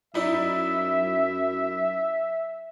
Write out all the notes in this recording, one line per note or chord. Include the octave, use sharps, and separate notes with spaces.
F#2 D#4 E4 D5 E5